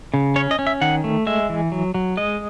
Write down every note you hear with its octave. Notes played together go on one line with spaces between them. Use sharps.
C#3
C#4 C#5
D#5
C#4
E5
D#3 F#5
A3
G#3 E5
E3
F#3
F#3
G#3 D#5